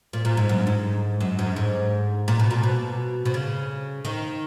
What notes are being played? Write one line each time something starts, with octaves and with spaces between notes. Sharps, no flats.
A#2
A#2
G#2
F#2
G#2
F#2
F#2
G#2
A#2
B2
A#2
B2
B2
C#3
D#3